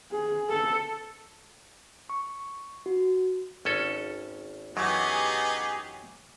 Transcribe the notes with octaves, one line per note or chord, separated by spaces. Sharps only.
G#4
A4
C#6
F#4
G#1 C#4 A4
F#2 E3 F#3 B3 D#4 G4 G#4